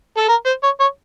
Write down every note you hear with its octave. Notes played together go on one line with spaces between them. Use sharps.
A4
A#4
C5
C#5
C#5